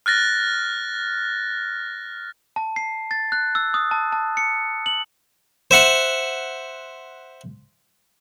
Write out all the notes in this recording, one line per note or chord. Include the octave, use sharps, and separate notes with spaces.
F6 F#6 A6 A#6
A5
C7
A6
F#6
E6
D#6
A5
A5
C#7
F#7
C5 E5 F#5 C6